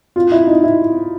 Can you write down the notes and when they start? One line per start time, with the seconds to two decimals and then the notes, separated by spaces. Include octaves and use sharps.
0.16 F4
0.32 E4
0.47 D#4
0.64 E4